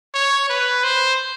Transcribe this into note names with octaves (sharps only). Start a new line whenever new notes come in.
C#5
B4
C5